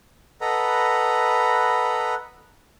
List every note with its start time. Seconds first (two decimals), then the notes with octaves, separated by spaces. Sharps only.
0.41 A4 B4 D#5 F#5 A#5 B5